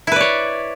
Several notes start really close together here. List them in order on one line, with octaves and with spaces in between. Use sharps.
E4 B4 D5 C#5